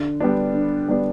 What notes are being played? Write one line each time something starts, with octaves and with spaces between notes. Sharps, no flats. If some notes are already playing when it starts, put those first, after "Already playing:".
Already playing: D3
G3 B3 D4
D3
G3 B3 D4